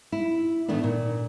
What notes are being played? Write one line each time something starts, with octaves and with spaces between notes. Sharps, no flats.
E4
A2 D#3 E3 A3 B3 D4
A#2